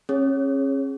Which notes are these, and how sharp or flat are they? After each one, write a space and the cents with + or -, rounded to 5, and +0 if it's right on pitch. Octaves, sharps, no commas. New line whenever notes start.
C#4 -35 G#4 +0 C#5 +0